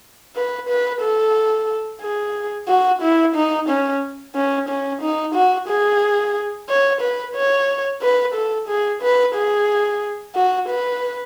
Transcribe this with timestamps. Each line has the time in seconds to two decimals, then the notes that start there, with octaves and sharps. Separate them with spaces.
0.36 B4
0.69 B4
1.01 A4
2.01 G#4
2.68 F#4
3.01 E4
3.35 D#4
3.69 C#4
4.35 C#4
4.69 C#4
5.02 D#4
5.34 F#4
5.68 G#4
6.69 C#5
7.01 B4
7.35 C#5
8.02 B4
8.35 A4
8.68 G#4
9.02 B4
9.35 G#4
10.35 F#4
10.68 B4